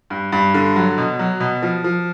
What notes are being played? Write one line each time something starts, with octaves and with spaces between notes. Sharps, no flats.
G2
G2
D3
F#3
B2
F#3
B2
F3
F3